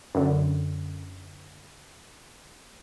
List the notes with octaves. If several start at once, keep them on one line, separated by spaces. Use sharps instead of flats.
F#2 D3